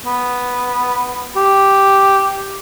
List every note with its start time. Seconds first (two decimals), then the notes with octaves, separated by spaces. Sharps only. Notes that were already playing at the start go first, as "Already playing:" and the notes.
0.06 B3
1.36 G4